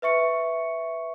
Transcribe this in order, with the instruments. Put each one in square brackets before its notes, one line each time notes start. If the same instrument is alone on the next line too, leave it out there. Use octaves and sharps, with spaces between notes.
[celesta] B4 E5 C#6 C#7